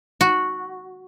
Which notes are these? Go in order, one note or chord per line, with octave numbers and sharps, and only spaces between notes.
F#4